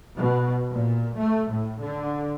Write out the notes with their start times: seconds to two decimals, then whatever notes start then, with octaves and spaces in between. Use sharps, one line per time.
0.17 B2
0.71 A#2
1.17 A3
1.51 A2
1.82 D3